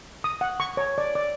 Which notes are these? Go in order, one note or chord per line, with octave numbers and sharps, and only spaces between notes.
D#6
F#5
C#6
C#5
D5
D5